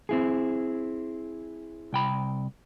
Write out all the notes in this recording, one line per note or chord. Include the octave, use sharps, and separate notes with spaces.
C4 E4 G#4
C2 G5 B5